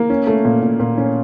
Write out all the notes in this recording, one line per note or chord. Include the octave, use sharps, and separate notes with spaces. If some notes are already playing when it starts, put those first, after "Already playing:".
Already playing: A#3
C#4
A3
A#2
A#2
A#2
C#4